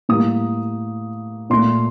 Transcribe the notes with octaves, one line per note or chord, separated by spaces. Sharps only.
A2 G3 A#3 D#6
A#2 A3 C6